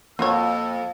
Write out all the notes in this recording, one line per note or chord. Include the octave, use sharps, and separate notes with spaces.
F2 A#3 F4 F#4 C#5 E6